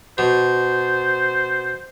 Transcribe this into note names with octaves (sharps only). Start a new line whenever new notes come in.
B2 C5